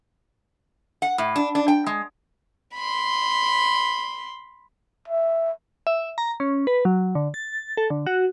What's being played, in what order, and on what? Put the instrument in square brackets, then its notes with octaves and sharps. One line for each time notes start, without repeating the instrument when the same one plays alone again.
[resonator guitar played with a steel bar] F#5
A2
D4
D4
G5
G#3
[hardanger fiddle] B5 C6
[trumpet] E5
[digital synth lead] E5
A#5
C#4
B4
F#3
D3
A6
A4
D3
F#4